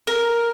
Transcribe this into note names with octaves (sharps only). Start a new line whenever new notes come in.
A#4